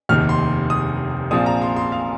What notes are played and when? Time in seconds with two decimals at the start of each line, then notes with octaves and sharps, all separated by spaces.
0.09 F1 D#2 D#3 F6
0.29 C6
0.70 D#6
1.31 A#1 A#2 F3 C4 F4 D#6
1.46 A#5
1.62 C6
1.77 C6
1.92 F5